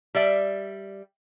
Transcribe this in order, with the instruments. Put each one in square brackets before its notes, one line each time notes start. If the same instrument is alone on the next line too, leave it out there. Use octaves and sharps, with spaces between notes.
[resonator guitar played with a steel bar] G3 D5 E5